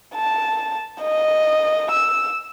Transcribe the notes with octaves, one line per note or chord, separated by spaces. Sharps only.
A5
D#5
E6